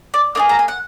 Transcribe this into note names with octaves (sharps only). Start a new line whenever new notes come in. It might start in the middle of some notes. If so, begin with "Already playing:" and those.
D5
A#3 D4 G#4 D#5
A#5
G#5
F#5